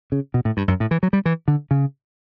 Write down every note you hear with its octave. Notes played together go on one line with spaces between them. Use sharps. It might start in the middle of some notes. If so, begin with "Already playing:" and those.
C#3
B2
A2
G2
F#2
A2
E3
F#3
G3
E3
D3
C#3